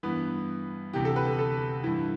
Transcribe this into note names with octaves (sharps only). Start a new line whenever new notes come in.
G2 E3 B3
D2 C3 E3 G4
A4
B4
A4
A4
G2 E3 E4